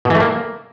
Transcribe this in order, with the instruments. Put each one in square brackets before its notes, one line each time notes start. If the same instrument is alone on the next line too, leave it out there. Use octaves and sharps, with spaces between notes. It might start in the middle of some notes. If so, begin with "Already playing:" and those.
[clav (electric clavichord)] B2
E3
A3
A#3